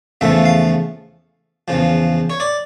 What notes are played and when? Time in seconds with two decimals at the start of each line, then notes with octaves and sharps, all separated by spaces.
0.21 E2 C#3 F3 A3 E5
0.45 F5
1.68 E2 C#3 F3
2.30 C#5
2.40 D5